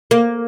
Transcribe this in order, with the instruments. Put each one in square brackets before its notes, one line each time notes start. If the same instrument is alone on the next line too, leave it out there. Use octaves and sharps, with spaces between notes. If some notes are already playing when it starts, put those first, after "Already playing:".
[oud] A#3